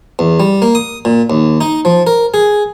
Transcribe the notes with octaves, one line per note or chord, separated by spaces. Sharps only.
E2
G3
A#3
D#6
A#2
D#2
D#4
F3
A#4
G#4